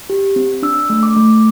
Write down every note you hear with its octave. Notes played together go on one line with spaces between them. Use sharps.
G4
C4
D4 E6
A3
D6
A3